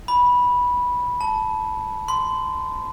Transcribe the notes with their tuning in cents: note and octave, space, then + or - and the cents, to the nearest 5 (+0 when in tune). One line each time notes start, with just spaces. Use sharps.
B5 -10
A5 -5
C6 -25